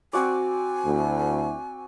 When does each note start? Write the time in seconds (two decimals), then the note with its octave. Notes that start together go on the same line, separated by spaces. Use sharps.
0.13 C4 F#4 D5 G#5
0.84 D2 E4